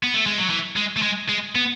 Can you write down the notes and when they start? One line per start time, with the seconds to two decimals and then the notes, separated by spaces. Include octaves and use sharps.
0.03 B3
0.14 A3
0.26 G#3
0.38 F#3
0.50 E3
0.76 G#3
0.97 A3
1.02 G#3
1.29 G#3
1.55 B3